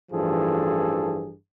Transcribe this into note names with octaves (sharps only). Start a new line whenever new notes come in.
A1 G2 E3 F3 G#4 A4